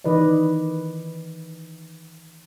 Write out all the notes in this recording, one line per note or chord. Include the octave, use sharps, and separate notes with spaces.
D#3 E3 B4 D5 D#5